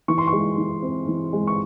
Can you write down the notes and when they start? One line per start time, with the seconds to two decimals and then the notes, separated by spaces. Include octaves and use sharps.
0.08 E3 C#6
0.18 C6
0.27 C#6
0.33 G#3
0.58 E3
0.82 C4
1.07 E3
1.33 G#3
1.47 C#6